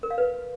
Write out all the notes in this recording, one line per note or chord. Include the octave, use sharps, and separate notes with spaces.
A#4
F5
B4